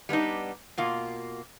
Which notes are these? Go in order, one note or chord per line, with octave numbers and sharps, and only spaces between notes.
G3 B3 D4 D#4
B2 A#3 F4